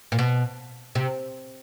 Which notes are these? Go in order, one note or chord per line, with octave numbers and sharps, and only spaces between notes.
A#2
B2
C3